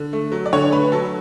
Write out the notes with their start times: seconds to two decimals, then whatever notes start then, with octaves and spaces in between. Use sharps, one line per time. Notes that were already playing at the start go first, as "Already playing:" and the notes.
Already playing: D3
0.13 A3
0.32 F#3
0.46 D5
0.53 D3 C#5
0.72 A3 B4
0.92 F#3 A4